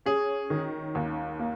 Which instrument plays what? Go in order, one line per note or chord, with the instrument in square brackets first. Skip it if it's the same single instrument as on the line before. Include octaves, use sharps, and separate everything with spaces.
[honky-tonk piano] C#4 [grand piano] G#4
[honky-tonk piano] D#3
D#2
A#3